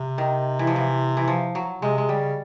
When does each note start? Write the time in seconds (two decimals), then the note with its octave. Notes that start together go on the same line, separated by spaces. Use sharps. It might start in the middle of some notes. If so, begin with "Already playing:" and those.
Already playing: C3
0.18 D#3
0.59 E3
0.67 F3
0.76 E3
1.17 E3
1.28 F3
1.55 F#3
1.82 C3 G#3
1.98 G#3
2.09 C#3 G3